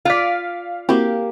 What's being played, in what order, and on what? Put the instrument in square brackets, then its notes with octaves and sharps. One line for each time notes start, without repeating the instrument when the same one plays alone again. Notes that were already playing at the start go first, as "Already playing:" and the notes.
[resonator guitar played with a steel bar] F4 D5 [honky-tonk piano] F5 F6 B6
[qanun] A#3 G4 [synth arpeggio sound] C4 E4 F#4